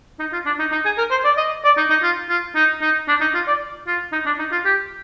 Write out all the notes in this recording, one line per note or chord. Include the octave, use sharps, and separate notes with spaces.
D#4
F4
D4
D#4
D#4
G#4
A#4
C5
D5
D#5
D5
D#4
D#4
F4
F4
D#4
D#4
D4
D#4
F4
D5
F4
D#4
D4
D#4
F4
G4